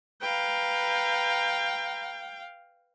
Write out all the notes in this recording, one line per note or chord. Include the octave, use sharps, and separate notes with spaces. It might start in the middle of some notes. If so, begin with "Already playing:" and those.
B4 F5 G5 A#5